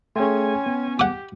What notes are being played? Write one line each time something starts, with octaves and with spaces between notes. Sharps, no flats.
A3 C#4 G#4 C#5 G5 G#5 C6
B3
G4 F#5 D6